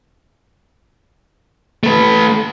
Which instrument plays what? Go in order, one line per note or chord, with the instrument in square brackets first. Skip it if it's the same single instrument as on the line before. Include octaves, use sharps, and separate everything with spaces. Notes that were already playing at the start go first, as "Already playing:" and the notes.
[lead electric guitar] A3 B4